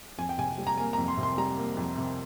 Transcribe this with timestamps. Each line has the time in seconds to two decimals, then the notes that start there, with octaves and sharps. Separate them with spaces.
0.18 F2 G#5
0.29 G5
0.38 C3 G#5
0.58 G3
0.67 A#5
0.77 A#3 G#5
0.93 A#5
0.98 F2
1.08 C6
1.17 C3
1.23 C6
1.38 G3 A#5
1.57 A#3
1.77 F2
1.97 C3